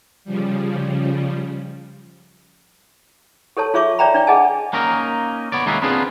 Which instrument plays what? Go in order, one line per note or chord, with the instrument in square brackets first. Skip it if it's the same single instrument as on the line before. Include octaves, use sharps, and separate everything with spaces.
[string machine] C#3 F3 G3
[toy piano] G4 A4 C#5 A5
F4 G#4 C#5 E5 C#6 D6
C#5 D5 E5 G5 A#5 B5
D4 D5 G5
G#4 D#5 F#5 G#5 A5
[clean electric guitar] A#3 C#4 D#4 A#4
B3 C#5 D5
D#3 G#3 A#3 B3 C#4 E4
B3 C4 D4 F4 G#4 B4